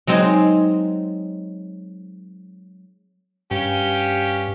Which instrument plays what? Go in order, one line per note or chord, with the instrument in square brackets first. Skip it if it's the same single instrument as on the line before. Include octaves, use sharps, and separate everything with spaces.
[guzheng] F#3 G#3 C4 D#4
[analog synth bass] G2 [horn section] C#4 G4 F5